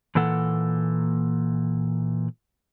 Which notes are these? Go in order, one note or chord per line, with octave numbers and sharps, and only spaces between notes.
A#2 E3 A#3 A4 F#5